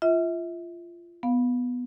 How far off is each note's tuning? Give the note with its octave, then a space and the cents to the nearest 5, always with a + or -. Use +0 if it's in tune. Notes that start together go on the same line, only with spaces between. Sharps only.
F4 -20 E5 -30
B3 +0 F5 +15